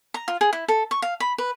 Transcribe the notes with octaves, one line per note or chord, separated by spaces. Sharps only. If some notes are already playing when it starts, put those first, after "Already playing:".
A#5
F4
G#4
E4
A4
C#6
F5
B5
B4